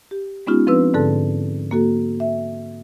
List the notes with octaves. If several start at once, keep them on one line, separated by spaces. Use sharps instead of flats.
G4
G#3 B3 C#4 D#4 F4 G4
F3 C4 D4 B4 E6
G#2 D3 A4 A5
A#3 F#4 A4
E5